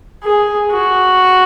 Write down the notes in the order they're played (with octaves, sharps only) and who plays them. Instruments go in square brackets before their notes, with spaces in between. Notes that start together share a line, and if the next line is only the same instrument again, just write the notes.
[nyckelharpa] G#4
F#4